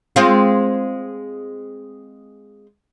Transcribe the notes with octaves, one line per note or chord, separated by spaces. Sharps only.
G#3 C4 F4